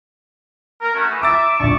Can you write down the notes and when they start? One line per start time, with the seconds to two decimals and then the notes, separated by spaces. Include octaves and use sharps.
0.81 A#4
0.95 A3 C#4 F#4
1.10 E3 A3 D#4
1.22 E5 A#5 D6 E6 A6
1.60 E1 A#1 D5 A5 C#6